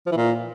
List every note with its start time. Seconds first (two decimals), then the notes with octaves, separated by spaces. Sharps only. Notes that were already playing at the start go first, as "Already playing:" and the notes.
0.06 F3
0.12 E3
0.17 A#2